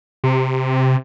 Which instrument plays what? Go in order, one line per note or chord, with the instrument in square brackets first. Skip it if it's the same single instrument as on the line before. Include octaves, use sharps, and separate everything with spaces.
[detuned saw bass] C3